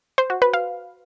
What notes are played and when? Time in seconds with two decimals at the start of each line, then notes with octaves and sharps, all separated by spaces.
0.18 C5
0.30 F#4
0.42 B4
0.53 F5